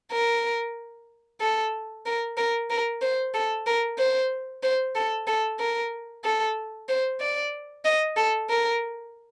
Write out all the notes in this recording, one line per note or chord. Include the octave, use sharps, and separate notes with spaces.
A#4
A4
A#4
A#4
A#4
C5
A4
A#4
C5
C5
A4
A4
A#4
A4
C5
D5
D#5
A4
A#4